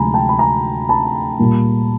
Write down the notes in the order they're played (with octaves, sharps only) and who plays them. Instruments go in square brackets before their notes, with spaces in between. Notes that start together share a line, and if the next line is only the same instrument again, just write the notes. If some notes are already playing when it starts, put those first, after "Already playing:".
Already playing: [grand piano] D2 C3 F3 G#3 G#5 A#5 B5
G5 A5
B5
G#5 A#5
A5 B5
A#2 G3 A#3